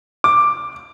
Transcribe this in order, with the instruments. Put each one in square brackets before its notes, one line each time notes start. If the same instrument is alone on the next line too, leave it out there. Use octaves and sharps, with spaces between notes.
[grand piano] D6